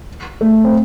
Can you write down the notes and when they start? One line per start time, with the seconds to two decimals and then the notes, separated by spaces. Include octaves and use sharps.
0.41 A3
0.64 C4